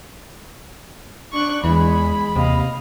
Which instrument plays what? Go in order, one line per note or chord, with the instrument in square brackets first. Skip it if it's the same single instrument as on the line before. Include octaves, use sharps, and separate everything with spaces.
[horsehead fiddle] D4 D5 [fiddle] C#6 F#6
[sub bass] E2 [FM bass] E3 [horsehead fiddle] G#3 [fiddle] B5
[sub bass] D#2 [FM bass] C3 [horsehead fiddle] D#5 F5